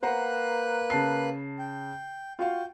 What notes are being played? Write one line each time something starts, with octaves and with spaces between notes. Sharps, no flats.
A#3 B4 C5 F#5 A#5 F#6
C#3 A5 C7
G5
F4 F#4 F5 G5